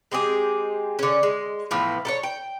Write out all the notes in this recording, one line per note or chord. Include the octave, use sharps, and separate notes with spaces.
G#3 C4 G4 G#4
D3 C#4
G#3
A2 E3 F3 B3
A4 A#4 C#5
G5